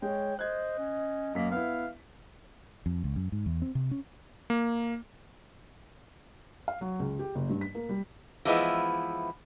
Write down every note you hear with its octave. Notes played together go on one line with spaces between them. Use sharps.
G#3 C#5 G5
C5 D#5 F#6 G#6
C#4
F#2 A#3 B6
B3 E4 F5
F2
C#2
F#2
G#2
E2
C4
C3
C#4
A#3
F5
F#3
C#2
G4
F#1
G2
B6
A#3
G3
E3 F3 G#3 B3 E4